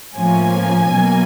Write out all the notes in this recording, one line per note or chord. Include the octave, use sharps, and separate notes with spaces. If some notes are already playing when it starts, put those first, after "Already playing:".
A2 F3 A#3 C#4 G#5
B2 F#3 A#3